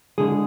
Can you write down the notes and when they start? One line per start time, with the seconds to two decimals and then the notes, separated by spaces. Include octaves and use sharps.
0.18 D3 G#3 G#4